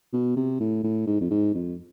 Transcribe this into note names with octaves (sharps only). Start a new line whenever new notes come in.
B2
C3
A2
A2
G#2
F2
G#2
F2